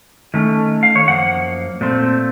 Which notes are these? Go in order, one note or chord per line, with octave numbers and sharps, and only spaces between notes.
D#3 A3 C#4
F5
C#5
F#2 F3 A#3 F#5
A#2 A3 C4